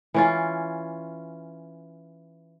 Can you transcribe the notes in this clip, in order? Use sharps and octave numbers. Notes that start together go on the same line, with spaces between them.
E3 C#4 F4